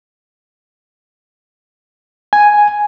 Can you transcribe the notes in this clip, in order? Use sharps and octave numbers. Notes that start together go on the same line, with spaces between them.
G#5